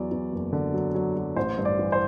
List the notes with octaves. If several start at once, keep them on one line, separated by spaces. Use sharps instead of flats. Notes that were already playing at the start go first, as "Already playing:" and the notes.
Already playing: E2 F#3 D5
E2
F#1
D3
F#3
F#3
F#3
A1 C5
G2
D5
E3
C5